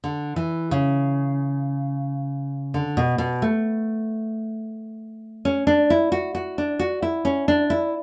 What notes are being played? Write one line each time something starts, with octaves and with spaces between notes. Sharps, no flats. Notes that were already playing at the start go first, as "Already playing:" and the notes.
D3
E3
C#3
D3
B2
B2
A3
C#4
D4
E4
F#4
F#4
D4
F#4
E4
C#4
D4
E4